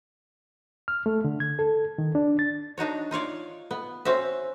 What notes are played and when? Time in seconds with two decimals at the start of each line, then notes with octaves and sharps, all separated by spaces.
0.88 F6
1.06 A3
1.24 D3
1.40 G#6
1.59 A4
1.98 D#3
2.15 D4
2.39 A6
2.78 D4 D#4 F#4 C#5
3.11 D#4 F4 C#5 D5
3.71 B3
4.05 C4 C#4 F#4 E5